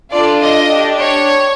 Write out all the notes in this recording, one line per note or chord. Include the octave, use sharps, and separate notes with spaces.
D4 F4 A4 D5
D#5
D4 G4
C#5